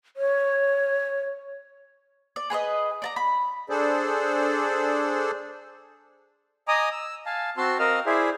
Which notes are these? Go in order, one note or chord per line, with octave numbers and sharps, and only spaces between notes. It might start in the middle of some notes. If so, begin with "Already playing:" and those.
C#5
D5
G#4 B4 C#5 D#5
D5 A5 A#5
B5
D4 G#4 A4 C5 D5
D#5 G#5 A#5 D6 D#6
E6
F5 G#5 A5
C4 F#4 A5 C6 E6
C4 A#4 D#5 F5 E6 F6
E4 G#4 C5 D5 E5